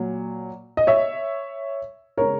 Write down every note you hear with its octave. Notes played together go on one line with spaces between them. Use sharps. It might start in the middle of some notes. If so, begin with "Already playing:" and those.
Already playing: A#2 F#3
D#5
C#5 E5
C#3 G#3 A#4 C#5